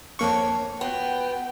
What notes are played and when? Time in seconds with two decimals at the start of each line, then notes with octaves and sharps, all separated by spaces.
0.19 F2 A#3 D4 C#5 C#6
0.81 B3 F4 F#4 G5